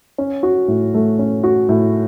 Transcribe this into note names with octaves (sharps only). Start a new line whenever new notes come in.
C#4
F#4
A2
A3
C#4
F#4
A2